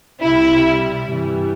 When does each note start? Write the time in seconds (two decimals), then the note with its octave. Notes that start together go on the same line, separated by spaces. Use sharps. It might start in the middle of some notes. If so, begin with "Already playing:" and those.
0.21 C2 C3 G3 E4
1.12 G2 E3 G3